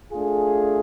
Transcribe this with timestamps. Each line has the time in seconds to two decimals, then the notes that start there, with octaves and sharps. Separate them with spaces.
0.12 A3 D4 F4 G#4